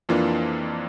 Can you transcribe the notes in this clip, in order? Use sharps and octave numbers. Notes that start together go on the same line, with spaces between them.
F2 E3 A#3 D4 F4